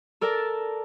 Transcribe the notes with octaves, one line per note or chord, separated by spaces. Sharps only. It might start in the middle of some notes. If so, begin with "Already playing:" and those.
A4 A#4 D5 A5